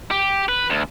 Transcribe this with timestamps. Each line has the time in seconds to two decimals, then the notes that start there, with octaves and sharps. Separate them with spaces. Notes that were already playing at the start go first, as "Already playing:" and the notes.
0.11 G4
0.49 B4
0.70 D2